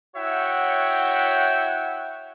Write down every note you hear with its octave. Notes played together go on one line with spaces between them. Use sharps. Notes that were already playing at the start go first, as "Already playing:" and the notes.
E4 F#4 C#5 E5 F#5 G5